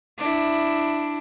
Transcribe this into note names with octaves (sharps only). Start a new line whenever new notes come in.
D4 E4